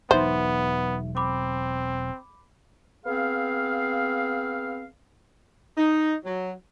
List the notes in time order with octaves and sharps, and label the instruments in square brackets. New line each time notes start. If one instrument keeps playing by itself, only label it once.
[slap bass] E1 F#3 [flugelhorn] B3 [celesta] D#4 E5 [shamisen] C5
[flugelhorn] C4 [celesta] B5 D6
[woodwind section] B3 C4 G#4 F5
[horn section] D#4
F#3